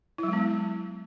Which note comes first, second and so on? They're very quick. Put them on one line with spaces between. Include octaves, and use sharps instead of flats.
E4 F#3 G#3 B3